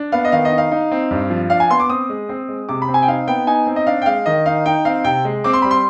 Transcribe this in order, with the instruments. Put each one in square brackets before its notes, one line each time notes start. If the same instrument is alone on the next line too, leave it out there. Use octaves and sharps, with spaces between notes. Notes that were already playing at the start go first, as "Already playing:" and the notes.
Already playing: [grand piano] D4
B3 F5
D#5
D#3 F5
D#5
D#4
F5
D#4
C4
G2
F3
D4 F5
G#5
B3 C6
D6
C4 D#6
G#3
C4
G#3
C3 D6
B5
C4
G#5
G5
D#4 F5
B3 G5
D#4 G#5
C4
D#5
D4 F5
G5
G#3 F5
D#3 D#5
D#4 F5
D#4 G5
C4 F5
C3 G5
G#3
C4 D6
C6
G3 B5
C6